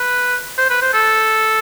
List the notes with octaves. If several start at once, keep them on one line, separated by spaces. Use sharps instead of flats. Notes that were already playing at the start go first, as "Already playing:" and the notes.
Already playing: B4
C5
B4
C5
A4